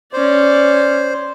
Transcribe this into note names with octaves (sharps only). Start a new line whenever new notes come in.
C#4 C5 D5